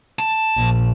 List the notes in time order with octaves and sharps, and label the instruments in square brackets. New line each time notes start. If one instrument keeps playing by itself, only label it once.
[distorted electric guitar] A5
[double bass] A#1